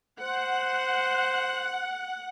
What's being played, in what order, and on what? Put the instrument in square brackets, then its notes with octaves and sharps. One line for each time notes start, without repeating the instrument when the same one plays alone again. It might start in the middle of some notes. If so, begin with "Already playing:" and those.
[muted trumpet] C5 [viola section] F#5